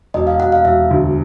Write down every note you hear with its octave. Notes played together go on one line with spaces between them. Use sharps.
E1 D#5
F5
E1 F#5
F5
E1 E5
D2